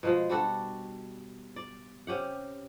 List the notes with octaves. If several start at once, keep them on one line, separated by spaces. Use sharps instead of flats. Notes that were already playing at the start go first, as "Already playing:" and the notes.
B2 F3 G#3
G3 D4 F#4 A4
D5
C3 C#4 G4 F#5